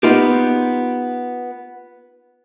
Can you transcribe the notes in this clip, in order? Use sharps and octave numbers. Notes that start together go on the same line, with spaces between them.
B3 D#4 F4 G4